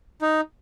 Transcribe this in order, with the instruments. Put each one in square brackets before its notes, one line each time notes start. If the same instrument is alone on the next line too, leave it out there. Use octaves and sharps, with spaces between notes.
[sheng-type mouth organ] D#4